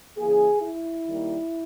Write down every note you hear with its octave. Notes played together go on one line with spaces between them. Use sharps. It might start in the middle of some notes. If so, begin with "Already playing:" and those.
C#3 E3 A#3 G#4
E4
D#3 G3 A#3